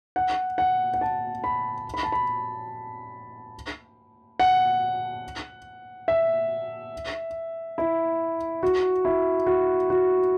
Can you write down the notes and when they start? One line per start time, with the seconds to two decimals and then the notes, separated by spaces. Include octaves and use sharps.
0.16 F#5
0.58 F#5
0.94 F#5
1.01 A5
1.44 B5
1.94 B5
2.03 A5
2.12 B5
4.40 F#5
6.08 E5
7.78 E4
8.63 F#4
9.05 E4
9.46 F#4
9.90 F#4